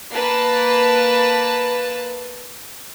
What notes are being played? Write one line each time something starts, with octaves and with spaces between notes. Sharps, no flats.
A#3 B4 A5